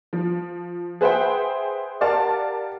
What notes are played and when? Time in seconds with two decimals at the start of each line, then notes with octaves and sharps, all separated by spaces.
0.13 F3
1.01 G#4 B4 C5 E5 F#5 G5
2.01 G4 A#4 D5 F5 F#5 A5